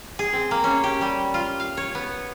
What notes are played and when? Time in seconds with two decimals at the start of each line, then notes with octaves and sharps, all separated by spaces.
0.19 G#4
0.33 C4
0.51 A#3
0.64 C#4
0.84 G4
1.01 G3
1.34 F4
1.60 F5
1.77 C#5
1.95 B3